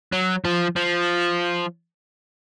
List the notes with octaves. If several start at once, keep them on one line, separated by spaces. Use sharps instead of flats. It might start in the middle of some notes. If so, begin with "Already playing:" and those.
F#3
F3
F3